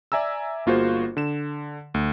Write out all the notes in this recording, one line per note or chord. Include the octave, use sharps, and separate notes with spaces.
D5 E5 G#5 A#5 E6
G1 A#3 F4 F#4 G#4 C5
D3 E7
D2